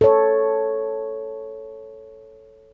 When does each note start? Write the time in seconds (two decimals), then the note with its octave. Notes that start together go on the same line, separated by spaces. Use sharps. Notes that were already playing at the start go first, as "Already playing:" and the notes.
0.01 A4 C#5